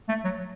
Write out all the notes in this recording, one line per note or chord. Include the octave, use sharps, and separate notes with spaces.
A3
F#3